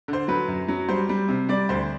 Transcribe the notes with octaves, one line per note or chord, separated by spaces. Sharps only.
D3 C5
F#3 B4
F#2
F#3
G3 C5
G3
C3
G3 D5
D2 C5